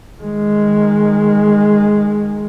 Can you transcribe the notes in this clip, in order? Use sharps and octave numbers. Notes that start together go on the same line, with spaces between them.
D#3 G#3